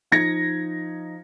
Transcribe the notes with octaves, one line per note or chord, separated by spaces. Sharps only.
F3 D#4 G#6 A#6 C#7